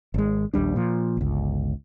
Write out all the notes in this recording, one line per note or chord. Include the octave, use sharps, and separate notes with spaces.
G#1 G#3
A#1 D#2 G3 D4
A#2 F3
G1 C#2